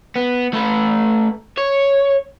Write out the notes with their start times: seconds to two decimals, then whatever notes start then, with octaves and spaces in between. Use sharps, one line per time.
0.16 B3
0.53 A3 B4
1.57 C#5